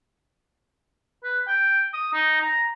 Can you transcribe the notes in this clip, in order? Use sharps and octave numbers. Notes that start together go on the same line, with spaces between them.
B4
G5
D#6
D#4
A#5